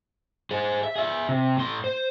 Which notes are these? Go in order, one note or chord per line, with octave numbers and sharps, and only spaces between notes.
G#4 C5
E5
G#4 E5
C3
A2 C6
C5